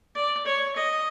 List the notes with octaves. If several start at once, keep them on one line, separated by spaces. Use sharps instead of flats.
D5
C#5
D#5